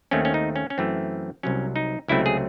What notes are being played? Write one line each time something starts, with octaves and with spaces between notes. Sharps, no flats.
D#2 D#3 A3 C4 C#4
C#4
D#4
C#4
C#4
F#2 E3 A3 C4
C2 C3 F#3 C#4
D#4
C#2 C3 F#3 A3 C4 E4
G#4